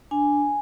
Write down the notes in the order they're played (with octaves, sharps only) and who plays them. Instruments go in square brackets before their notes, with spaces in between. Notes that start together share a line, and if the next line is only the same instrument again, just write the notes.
[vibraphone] D4 G#5